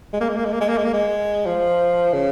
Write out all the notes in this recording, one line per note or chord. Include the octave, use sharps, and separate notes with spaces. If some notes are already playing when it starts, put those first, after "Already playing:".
G#3
A#3
G#3
A#3
G#3
A#3
G#3
A#3
G#3
A#3
G#3
F3
C#3